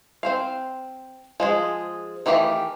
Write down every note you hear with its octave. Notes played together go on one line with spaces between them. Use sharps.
C4 C5 F5
F3 G#3 G#4
D#3 E3 A3 G4 F5